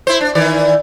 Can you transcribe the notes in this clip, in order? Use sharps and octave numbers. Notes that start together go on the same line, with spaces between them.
E4 C5
D4
D#3 E3 D5